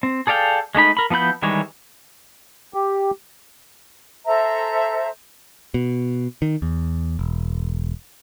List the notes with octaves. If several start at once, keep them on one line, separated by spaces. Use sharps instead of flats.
C4
G#4 A4 D5 F5 G5
G#3 A3 D#4 B5
A#4 B5
F3 B3 E4 B5 G6
D#3 E3 G3 G#3 C#5
G4
A4 C5 E5 A#5
B2
D#3
E2
E1